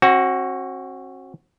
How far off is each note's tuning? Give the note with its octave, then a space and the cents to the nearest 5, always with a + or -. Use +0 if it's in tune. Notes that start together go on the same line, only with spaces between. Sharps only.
C4 +45 F#4 +0